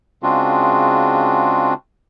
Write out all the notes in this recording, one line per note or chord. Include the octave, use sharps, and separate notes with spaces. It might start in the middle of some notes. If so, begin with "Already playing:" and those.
C#3 G#3 C4 D4 F4 F#4